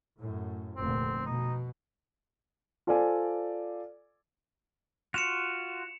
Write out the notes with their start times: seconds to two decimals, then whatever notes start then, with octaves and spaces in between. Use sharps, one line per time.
0.19 F#2 A2
0.76 F1 D2 A#2 C4
1.26 B2 D#4
2.87 F4 A4 C5 D5 F5 G#5
5.14 F4 F#4 C#7 E7 F7